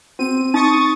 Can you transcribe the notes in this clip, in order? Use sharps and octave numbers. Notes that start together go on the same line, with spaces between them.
C4 D#7
D#4 C#6 D#6 A6